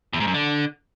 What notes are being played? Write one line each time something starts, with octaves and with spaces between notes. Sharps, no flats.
E2
G#2
F#2
D3